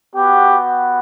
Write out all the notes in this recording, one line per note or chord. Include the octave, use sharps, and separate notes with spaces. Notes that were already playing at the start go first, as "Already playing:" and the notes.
B3 F#4 G4